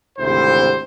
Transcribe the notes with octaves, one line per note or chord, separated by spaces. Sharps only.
G#1 D2 C3 E4 C5